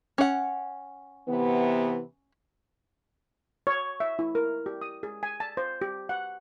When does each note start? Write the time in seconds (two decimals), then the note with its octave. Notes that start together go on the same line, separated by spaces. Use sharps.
0.18 C#4 F#5
1.28 C3 E3 B3
3.67 C#5
4.00 E5
4.19 E4
4.35 A#4
4.66 G4
4.82 D#6
5.03 G#4
5.23 G#5
5.40 A5
5.57 C5
5.82 G4
6.09 F#5